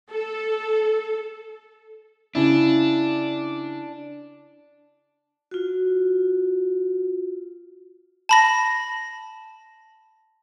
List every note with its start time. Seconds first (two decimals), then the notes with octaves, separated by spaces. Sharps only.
0.11 A4
2.35 C#3 D4 E4
5.51 F4 F#4
8.29 A5 B5 A#6